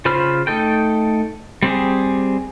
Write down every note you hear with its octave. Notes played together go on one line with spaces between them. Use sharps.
C#3 F4 C5 B5 F6
A3 D#4 A4 G5
G3 C4 G4 G#4